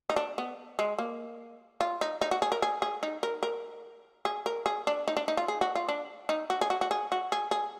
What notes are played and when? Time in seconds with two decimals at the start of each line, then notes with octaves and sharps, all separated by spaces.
0.10 D#4
0.16 D4
0.38 B3
0.79 G#3
0.98 A#3
1.81 F4
2.01 D#4
2.21 D#4
2.31 F#4
2.42 G#4
2.52 A#4
2.62 G#4
2.82 G#4
3.03 D#4
3.23 A#4
3.43 A#4
4.25 G#4
4.46 A#4
4.66 G#4
4.87 D4
5.08 D#4
5.17 D4
5.28 D#4
5.37 F4
5.48 G#4
5.61 F#4
5.75 F4
5.89 D4
6.29 D#4
6.50 F#4
6.61 G#4
6.70 F#4
6.81 F#4
6.91 G#4
7.12 F#4
7.32 G#4
7.51 G#4